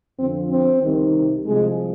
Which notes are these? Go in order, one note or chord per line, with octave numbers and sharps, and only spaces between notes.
F2 D3 F3 C4
C4
C2 C3 D#3
C2 C3 F3 G#3